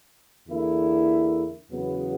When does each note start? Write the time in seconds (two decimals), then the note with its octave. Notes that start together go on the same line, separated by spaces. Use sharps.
0.48 E2 D3 A#3 E4
1.69 E2 C#3 F#3 B3